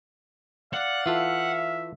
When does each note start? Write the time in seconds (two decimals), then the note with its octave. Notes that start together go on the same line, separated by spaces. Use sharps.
0.74 D5 F5 F#5
1.06 E3 F4 A4 E5